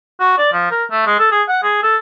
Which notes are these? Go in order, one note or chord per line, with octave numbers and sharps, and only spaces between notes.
F#4
D5
F3
A#4
A3
G#3
A4
G#4
F#5
G#4
A4